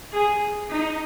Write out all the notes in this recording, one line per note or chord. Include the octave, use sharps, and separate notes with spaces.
G#4
D#4